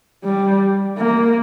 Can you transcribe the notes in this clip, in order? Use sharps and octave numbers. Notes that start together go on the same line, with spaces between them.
G3
A#3